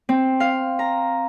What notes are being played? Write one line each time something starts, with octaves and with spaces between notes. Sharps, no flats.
C4
F5
A#5